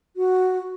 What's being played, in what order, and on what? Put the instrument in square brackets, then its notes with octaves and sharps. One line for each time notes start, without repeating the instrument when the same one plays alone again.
[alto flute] F#4